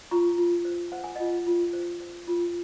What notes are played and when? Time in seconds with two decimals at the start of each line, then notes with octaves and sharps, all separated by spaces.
0.11 F4 A#5 C#6
0.38 F4
0.65 C5
0.92 C5 F#5
1.04 G#5
1.16 F4 D#5 F#5
1.46 F4
1.73 C5
2.00 C5
2.27 F4